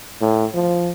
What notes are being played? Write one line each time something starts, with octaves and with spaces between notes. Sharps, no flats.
A2
F3